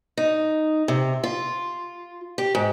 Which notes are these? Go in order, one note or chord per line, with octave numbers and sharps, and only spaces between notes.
D#4
C3
F4
G4
G#2